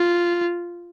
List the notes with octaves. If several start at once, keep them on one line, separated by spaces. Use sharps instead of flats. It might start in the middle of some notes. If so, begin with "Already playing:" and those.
Already playing: F4